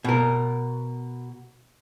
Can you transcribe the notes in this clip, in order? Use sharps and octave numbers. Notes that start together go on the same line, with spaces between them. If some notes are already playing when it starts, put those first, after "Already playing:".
B2 A#4